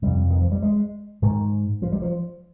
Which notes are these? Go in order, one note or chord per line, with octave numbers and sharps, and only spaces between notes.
F2 C3 G3
D#3
F3
G3
G#3
G#2 D#3
F3
G3
F3